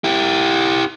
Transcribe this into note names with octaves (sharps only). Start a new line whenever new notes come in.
E4 G4